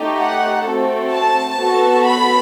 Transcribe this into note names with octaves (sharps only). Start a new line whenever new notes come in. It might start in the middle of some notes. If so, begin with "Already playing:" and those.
Already playing: A3 D#4 G4
F#5
A3 C4 F#4 A4
A5
B3 F#4 A4
B5